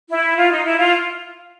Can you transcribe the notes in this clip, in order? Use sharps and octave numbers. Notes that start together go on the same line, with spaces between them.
E4
F4
D#4
E4
F4